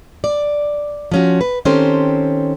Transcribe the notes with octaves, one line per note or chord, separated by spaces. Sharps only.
D5
F3 C#4 F#4
B4
D#3 C4 C#4 G4 A4 C5